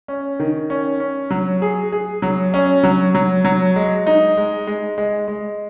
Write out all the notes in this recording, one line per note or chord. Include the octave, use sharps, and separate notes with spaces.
C#4
D#3
C#4
C#4
F#3
G#4
G#4
F#3
C#4
F#3
F#3
F#3
G#3
D#4
G#3
G#3
G#3
G#3